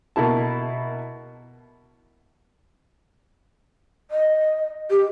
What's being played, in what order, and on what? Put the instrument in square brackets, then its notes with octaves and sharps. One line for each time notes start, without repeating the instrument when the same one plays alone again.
[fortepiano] B2 A#3 E4 A5
[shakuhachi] D#5
G4